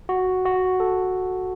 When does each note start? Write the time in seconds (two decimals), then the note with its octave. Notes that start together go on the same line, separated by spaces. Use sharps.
0.09 F#4
0.45 F#4
0.80 A4